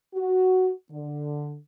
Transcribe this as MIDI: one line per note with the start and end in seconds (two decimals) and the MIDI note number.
0.15 0.71 66
0.91 1.56 50